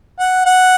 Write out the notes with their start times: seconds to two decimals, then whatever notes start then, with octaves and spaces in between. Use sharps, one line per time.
0.19 F#5
0.46 F#5